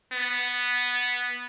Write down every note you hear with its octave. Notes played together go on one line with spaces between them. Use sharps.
B3